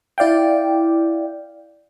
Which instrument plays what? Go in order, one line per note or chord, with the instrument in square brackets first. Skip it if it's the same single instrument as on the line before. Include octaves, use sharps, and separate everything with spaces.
[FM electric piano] E4 D5 F5 G5